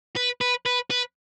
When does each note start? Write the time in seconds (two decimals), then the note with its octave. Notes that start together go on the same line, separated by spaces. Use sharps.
0.16 B4
0.41 B4
0.66 B4
0.90 B4